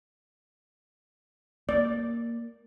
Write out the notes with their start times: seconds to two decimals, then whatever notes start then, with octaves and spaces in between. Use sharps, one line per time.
1.69 A#3 D5